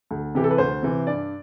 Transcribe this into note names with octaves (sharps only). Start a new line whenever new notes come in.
D2
C3 E3 G4
A4
B4
D2 C5
C3 E3
G2 D5